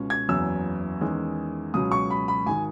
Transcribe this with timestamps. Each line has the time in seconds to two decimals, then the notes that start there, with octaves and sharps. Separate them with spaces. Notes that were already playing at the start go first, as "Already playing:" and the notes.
Already playing: C#2 B2 C#4
0.10 G#6
0.29 F#1 E2 C#3 F#3 E6
1.01 E2 D#3 G#3 C#4
1.74 C#2 B2 F#3 C#4 D#6
1.92 C#6
2.10 B5
2.28 B5
2.46 G#1 D#3 G#5